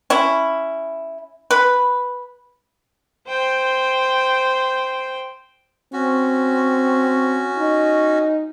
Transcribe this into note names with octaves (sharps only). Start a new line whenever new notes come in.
C#4 E4
B4
C5 G5
C4 C#4 F#4
D#4